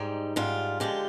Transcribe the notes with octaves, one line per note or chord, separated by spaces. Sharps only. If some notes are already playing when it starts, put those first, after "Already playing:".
Already playing: G#2 G3 D#4
G#2 G3 F4
D3 F3 G#3 G4